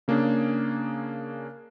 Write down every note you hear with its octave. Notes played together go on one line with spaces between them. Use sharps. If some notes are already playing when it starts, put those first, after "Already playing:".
C#3 A#3 C#4 D4 G#4